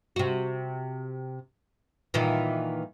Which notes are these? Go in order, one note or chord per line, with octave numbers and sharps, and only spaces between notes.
C3 F#4
A#2 D#3 E3